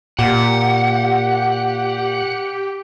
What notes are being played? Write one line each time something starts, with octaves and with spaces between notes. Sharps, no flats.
A#2 G4 F#5